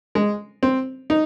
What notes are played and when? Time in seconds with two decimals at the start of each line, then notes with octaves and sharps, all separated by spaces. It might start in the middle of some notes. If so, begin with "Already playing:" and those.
0.15 G#3
0.63 C4
1.10 D#4